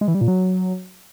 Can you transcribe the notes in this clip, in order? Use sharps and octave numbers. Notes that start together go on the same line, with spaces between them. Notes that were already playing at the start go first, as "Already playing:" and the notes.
G#3
E3
G3
A#2
F#3